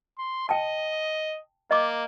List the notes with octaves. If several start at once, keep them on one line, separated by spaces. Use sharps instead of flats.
C6
D#5 G5 A5
A#3 D#5 D6